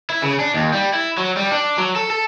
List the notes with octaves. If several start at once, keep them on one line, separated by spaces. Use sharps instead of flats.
E4
C#3
D4
D#2
G3
E4
F#3
G3
D4
F#3
A4
A4